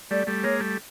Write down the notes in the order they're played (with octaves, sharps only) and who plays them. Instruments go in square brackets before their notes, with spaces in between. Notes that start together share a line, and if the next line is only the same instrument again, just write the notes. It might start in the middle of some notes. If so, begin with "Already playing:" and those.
[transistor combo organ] G3 A3 [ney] D5
[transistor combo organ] G3 A3
[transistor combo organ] G#3 A#3 [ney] C#5
[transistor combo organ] G3 A3